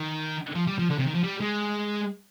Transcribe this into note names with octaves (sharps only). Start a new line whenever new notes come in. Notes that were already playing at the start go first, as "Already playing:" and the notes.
Already playing: D#3
F3
G3
F3
D3
C3
D#3
F3
G3
G#3